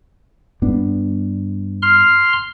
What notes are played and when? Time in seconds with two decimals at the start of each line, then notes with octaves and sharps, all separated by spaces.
0.62 G2 B3 D4
1.82 C6 F6